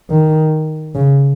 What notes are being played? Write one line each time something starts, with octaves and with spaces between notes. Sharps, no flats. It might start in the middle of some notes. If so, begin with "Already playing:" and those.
D#3
C#3